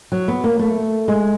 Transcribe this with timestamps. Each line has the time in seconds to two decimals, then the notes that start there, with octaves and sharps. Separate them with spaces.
0.12 F#3
0.28 B3
0.44 A#3
0.59 A3
1.08 G#3